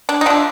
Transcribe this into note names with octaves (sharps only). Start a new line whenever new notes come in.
D4
D#4
F3 A3 D4